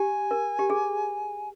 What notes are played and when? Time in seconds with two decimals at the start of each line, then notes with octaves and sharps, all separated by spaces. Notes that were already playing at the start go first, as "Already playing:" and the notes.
Already playing: G4 G#5
0.31 A#4
0.59 G4
0.70 G#4